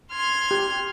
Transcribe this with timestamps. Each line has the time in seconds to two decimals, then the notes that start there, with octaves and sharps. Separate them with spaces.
0.10 C6 F6 G#6
0.51 G4